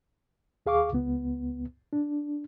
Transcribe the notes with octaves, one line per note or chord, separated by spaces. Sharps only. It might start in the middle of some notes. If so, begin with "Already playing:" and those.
D#2 G#4 F5 C#6 D6
C#2 B3
D4